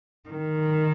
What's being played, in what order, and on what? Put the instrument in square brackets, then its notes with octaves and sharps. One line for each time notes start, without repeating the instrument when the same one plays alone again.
[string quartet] D#3